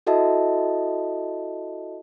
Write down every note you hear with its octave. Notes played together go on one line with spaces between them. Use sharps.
E4 F#4 A4 D#5 E5 A5